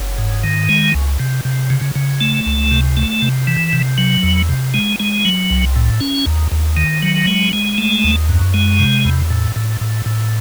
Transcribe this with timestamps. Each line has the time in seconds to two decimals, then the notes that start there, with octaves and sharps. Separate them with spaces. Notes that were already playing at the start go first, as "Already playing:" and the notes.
Already playing: F#1
0.18 G#2
0.44 D#3
0.69 G#3
0.94 C#2
1.20 C3
1.45 C3
1.70 C#3
1.95 C#3
2.21 A3
2.46 C#2
2.71 C3
2.97 A3
3.22 C3
3.47 E3
3.73 C3
3.98 F#3
4.23 E2
4.49 C3
4.74 G#3
5.00 G#3
5.25 F#3
5.50 C2
5.76 A2
6.01 C#4
6.26 D#2
6.52 D#2
6.77 D#3
7.02 F#3
7.27 G#3
7.53 G#3
7.78 A3
8.04 D#2
8.29 F#2
8.54 G#3
8.79 C3
9.05 E2
9.30 A2
9.56 A2
9.81 A2
10.06 A2